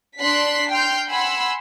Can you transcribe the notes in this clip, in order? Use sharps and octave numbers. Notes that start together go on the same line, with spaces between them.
D4 C6 F#6 B6 C7
G5 C6 F6 G6
F#5 G#5 B5 C6 E6